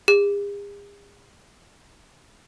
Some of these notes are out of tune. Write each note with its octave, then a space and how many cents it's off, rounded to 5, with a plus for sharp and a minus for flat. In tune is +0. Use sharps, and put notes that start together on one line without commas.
G#4 -45